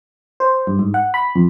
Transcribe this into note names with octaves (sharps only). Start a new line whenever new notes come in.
C5
G2
G#2
F#5
B5
F2